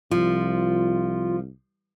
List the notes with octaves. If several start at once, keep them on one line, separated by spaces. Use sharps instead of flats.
C2 F3 F4